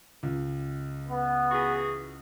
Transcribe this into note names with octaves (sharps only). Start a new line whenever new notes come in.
C#2
B3
E3 F#4 G#4